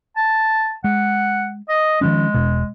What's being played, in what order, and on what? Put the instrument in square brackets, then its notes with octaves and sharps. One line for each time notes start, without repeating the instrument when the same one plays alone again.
[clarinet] A5
[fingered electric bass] G#3 [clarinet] F#5
[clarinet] D#5
[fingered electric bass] D#3 F3 C#4 [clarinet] G#3
[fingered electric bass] E1 B2